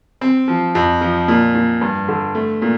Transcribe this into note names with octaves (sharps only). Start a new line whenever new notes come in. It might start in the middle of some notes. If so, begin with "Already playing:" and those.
C4
F3
F2
F3
A#2
A#2
G2
D3
A3
A#2